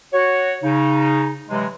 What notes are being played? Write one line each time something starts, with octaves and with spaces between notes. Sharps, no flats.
F#4 C#5
C#3 D#4
C3 E3 F#3 G#3